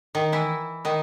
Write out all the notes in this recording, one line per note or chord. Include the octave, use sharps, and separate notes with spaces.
D#3 D#4
E3 E4
D#3 D#4